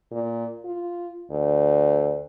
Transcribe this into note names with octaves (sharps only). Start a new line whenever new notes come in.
A#2
F4
D2